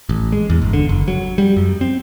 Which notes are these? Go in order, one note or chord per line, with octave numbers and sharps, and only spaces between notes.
A1
G#3
E2
G1
D3
F#1
F#3
G3
F#2
C4